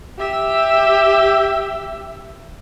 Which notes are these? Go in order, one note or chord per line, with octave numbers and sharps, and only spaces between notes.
G4 E5